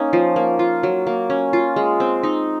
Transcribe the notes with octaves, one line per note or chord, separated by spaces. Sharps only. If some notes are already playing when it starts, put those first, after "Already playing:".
Already playing: A#3 C#4 D#4
F3
A#3
F4
F#3
A#3
C#4
F4
G#3
C4
D#4